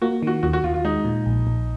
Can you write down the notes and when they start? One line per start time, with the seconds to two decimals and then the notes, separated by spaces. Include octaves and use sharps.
0.02 A#3 F#4
0.23 D#3 F#4
0.43 D#2 F#4
0.53 F#4
0.64 D#2 F4
0.74 F4
0.85 G#3 D#4
1.05 A#2
1.26 A#1
1.47 A#1